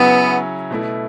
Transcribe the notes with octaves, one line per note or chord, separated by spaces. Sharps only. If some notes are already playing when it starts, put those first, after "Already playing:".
Already playing: C#3 F#3 B3 C#4 E4
B2 A3 E4